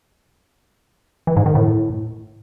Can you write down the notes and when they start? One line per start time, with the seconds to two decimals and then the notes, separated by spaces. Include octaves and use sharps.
1.27 E3
1.37 G#2
1.46 D#3
1.55 A2